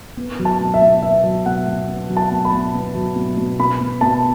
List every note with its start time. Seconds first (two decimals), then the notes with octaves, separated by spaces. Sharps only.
0.17 B3
0.39 F#3
0.45 A5
0.60 B2
0.74 E5
0.81 B2
1.02 B3 E5
1.24 F#3
1.46 B2 F#5
1.67 B2
1.88 B3
2.09 F#3
2.17 A5
2.31 B2
2.45 B5
2.52 B2
2.74 B3
2.94 F#3
3.16 B2
3.37 B2
3.59 B2 B5
3.80 B3
4.01 B2 A5